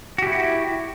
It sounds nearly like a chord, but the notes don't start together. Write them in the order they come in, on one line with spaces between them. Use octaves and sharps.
F#4 G4 E4